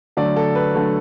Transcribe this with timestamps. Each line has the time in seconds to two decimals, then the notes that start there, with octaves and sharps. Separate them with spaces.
0.17 D3 F#3 A3 D5
0.36 A4
0.55 B4
0.75 D3 F#3 A3